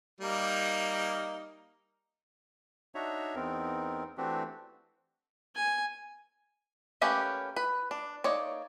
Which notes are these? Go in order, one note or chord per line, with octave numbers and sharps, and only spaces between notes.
G3 A#3 D#4
D4 D#4 F#4 C#5 E5 A#5
E2 B3 C4 D#4 A#4
E3 A3 C4 D4 F#4 G4
G#5
A3 A#3 C#4 G4 B4
B4
D4
A#3 D#4 C#5 D5